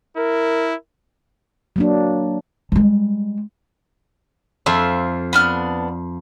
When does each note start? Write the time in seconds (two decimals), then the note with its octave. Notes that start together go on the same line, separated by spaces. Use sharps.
0.17 E4 A#4
1.76 F#3 A#3 D4
2.72 G3 G#3
4.66 F2 F4 E5
5.33 B3 D4 F6